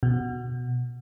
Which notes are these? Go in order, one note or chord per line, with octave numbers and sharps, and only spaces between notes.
B2